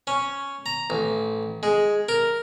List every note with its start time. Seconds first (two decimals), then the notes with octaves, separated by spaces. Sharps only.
0.07 C#4
0.66 A#5
0.90 A1
1.63 G#3
2.09 A#4